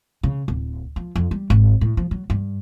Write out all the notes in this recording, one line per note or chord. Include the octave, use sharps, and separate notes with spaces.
C#3
D1
F3
F2
G3
G#1
A2
F3
F#3
G2